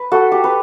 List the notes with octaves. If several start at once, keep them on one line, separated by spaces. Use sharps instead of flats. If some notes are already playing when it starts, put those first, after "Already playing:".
Already playing: B4
F#4 A4
G4
B4